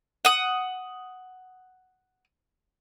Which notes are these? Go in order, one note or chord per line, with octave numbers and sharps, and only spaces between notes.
F#5 D#6